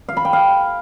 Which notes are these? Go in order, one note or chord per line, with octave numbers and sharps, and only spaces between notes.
F5
B5
G5
F5